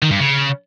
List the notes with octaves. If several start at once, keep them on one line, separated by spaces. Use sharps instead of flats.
D#3
G2
C#3